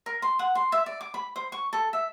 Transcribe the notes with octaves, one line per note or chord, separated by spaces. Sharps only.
A#4
C6
F#5
C6
E5
D5
D6
B5
C5
C#6
A4
E5